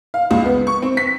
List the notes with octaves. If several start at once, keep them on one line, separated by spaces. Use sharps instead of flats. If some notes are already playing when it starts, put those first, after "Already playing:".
F5
C#2
B3
C#6
C4
B6